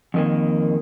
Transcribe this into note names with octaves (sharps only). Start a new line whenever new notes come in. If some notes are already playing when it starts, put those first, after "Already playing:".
F2 D#3 A#3